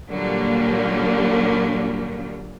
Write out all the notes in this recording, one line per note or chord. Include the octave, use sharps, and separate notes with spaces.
A#2 D3 F#3 G3 A#3